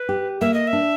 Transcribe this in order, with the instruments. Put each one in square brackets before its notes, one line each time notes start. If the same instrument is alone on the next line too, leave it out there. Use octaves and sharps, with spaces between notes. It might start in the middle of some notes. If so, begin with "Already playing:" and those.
Already playing: [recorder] B4
[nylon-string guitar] G4
[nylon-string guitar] A#3 [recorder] E5
[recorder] D#5
E5
[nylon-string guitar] D4